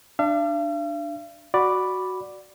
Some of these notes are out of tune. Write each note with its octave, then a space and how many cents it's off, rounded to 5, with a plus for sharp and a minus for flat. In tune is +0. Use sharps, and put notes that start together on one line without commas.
D4 +15 F5 -45
F#4 +5 D5 +0 B5 +0